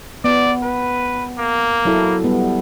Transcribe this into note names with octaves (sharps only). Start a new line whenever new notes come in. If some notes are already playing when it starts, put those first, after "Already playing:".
B3 D5
B4
A#3
F#3 E4 A4
G3 B3